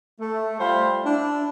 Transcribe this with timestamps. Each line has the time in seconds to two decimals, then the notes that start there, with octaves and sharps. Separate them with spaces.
0.20 A3
0.59 G3 A3 F4 C5 F5 B5
1.04 D4 E4